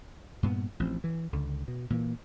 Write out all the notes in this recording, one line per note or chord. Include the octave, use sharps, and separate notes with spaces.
G2 A#2 B3
A1 F3 C4
E3
C#2 D3
B2
A#2 E3 A#3